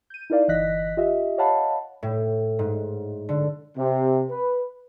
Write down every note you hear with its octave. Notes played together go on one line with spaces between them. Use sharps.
G6 D#7
D#4 E4 A#4 D5 F5
G1 E3 D#5 F#6 A#6 B6
F4 G4 D#5 E5
C#5 D#5 F5 F#5 A5 B5
A2
G#2
D3
C3
B4